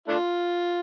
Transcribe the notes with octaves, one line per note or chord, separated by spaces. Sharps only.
A3 D4 F4